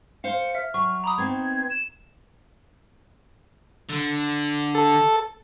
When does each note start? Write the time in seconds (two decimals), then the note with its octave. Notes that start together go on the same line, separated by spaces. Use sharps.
0.24 C5 F5 C#7
0.55 E5 F6
0.74 F#3 C#6
1.04 A#5 B5 D6 D#6
1.18 B3 C4 D#4 G#6
1.70 E7
3.89 D3
4.75 A4